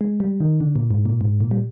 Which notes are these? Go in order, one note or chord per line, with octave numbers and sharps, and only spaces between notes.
G#3
G3
D#3
D3
A#2
G#2
A#2
G#2
A#2
G3